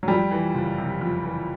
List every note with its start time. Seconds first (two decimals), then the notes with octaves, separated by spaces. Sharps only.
0.03 F#3
0.08 F2 G3
0.31 E3
0.55 F#1
0.78 C3
1.01 F2
1.24 E3